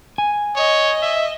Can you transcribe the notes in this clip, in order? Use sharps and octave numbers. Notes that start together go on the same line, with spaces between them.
G#5
C#5 D#5
E5